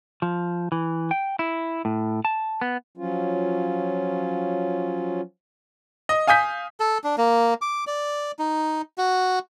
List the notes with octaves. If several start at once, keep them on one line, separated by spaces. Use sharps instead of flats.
F3
E3
G5
E4
A2
A5
B3
F3 F#3 C#4 F4
D#5
F5 G#5 D#6 G6 B6
A4
D4
A#3
D6
D5
D#4
F#4